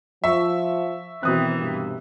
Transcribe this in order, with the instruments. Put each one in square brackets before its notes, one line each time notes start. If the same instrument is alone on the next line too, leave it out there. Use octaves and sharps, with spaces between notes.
[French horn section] F3 [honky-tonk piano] E5 [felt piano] C#6
[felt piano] B2 D#6 F#6 [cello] D#3 E3 [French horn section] C4
[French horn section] G2 C3